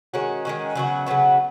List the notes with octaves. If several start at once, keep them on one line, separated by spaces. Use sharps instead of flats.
D#3 G#3 C#4 F#4
D#3 G#3 C#4 F#4
C#3 F#3 B3 F#4
C#3 F#3 B3 F#4